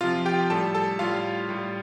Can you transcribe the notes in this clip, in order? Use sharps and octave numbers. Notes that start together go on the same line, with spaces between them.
C3 F3 F4 F5
G4 G5
A2 G3 A4 A5
A4 A5
A2 G3 F4 F5
A2 G3